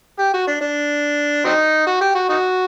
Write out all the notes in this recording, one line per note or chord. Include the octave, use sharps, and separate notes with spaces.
G4
F#4
D4
D4
F#3 C4 D#4
F#4
G4
F#4
D#4 F#4